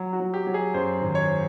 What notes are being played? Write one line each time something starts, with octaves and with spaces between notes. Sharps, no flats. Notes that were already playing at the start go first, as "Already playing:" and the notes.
Already playing: F#3
F#4
F#3
G4
F#3
G#4
F#2 C5
G#1
C#5